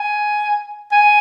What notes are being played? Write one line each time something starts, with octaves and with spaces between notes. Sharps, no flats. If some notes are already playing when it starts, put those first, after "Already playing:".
Already playing: G#5
G#5